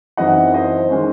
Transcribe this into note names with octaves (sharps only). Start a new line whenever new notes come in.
F#2 E3 C4 D#4 D#5 F#5
C5 D#5
D#3 G#3 C#4